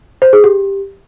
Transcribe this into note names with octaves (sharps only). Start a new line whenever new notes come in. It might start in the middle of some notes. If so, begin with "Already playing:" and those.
C5
G#4
G4